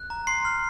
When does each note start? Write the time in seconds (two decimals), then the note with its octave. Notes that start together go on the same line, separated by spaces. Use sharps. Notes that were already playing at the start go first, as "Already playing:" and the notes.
Already playing: F#6
0.10 A#5
0.27 C6 C7
0.45 F6